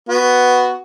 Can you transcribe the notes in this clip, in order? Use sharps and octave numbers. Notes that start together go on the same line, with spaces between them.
B3 F#4